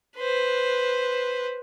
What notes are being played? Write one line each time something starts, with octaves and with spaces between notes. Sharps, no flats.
B4 C5